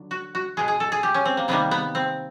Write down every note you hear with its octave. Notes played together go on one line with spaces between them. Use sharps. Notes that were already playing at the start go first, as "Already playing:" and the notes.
Already playing: D3 F#3
F#4
F#4
B2 G#3 G#4
G#4
A4
G#4
G4
C#4
C4
A#3
C3 D#3 G3 A#3 B3
B3
C4